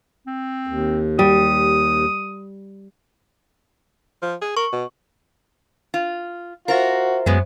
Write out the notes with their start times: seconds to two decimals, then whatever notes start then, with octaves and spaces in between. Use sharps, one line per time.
0.27 C4
0.67 D#2
1.19 G3 D#6
4.22 F3
4.42 G#4
4.57 A#4 C#6
4.73 B2
5.94 F4
6.68 F4 F#4 A#4 C5 E5
7.26 F#2 F#3 G#3 B3